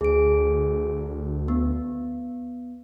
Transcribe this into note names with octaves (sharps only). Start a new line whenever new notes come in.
D2 G#4 D7
B3